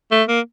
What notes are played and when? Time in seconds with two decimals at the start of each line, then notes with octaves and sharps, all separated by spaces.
0.11 A3
0.28 A#3